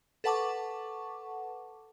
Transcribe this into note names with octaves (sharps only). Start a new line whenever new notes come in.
A4 B4 F#5 A5 C#6 D6